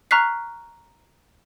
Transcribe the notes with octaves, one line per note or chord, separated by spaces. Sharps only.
A#5 C#6 F6 F#6 B6 C7